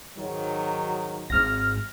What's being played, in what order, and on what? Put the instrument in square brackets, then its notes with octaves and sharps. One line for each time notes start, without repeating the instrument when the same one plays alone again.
[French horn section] G#2 D#3 F#3
[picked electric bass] G#1 G#2 [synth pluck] F6 A#6